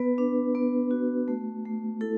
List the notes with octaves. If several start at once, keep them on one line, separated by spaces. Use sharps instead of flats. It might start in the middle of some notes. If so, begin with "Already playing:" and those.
Already playing: B3 B4
D4
B3
F#4
A3
A3
E4 A4